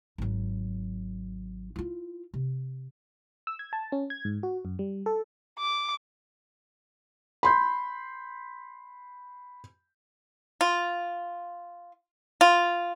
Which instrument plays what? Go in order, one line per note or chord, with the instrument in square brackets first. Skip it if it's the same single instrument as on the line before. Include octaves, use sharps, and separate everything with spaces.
[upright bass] G#1 F#3
E4 F4
C3
[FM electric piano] E6
G#6
A5
C#4
G#6
G#2
F#4
F#2
G3
A4
[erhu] D6
[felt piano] B5 C6 G6
[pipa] F4
F4